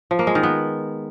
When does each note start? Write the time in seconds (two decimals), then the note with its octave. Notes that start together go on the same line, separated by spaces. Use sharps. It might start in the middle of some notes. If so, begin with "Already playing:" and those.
0.11 F3
0.19 A#3
0.27 G#3
0.35 D#3
0.43 B3